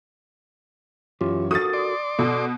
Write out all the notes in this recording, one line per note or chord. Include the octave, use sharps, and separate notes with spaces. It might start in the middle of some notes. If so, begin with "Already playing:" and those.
F#2 E3 C#4 F4 G4
F#4 A4 A#4 D#6 A6
D5 C6 D6
B2 A4